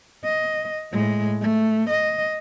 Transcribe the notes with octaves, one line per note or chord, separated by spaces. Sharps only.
D#5
A2 G#3
A3
D#5